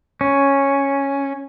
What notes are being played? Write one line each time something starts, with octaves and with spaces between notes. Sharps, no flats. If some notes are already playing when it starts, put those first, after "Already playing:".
C#4